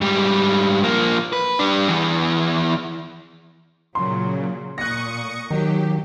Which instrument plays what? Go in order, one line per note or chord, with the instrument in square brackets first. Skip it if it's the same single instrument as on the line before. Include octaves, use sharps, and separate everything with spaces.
[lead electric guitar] G#2 G3
F3 A#3
B4
G3 D4
E2 E3
[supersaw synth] A#2 C#3 [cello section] F#3 [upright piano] C6
[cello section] A#2 [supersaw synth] C#6 D#6 C#7 [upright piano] F#6 A#6
[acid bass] D#3 [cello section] F#3 [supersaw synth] G4